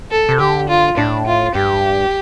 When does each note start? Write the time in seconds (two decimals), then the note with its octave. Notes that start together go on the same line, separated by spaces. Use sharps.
0.11 A4
0.29 C3
0.40 D3 G4
0.69 F4
0.97 A2 D4
1.26 F4
1.55 G2 G4